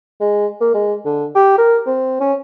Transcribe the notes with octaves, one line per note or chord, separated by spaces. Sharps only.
G#3
A#3
G#3
D3
G4
A#4
C4
C#4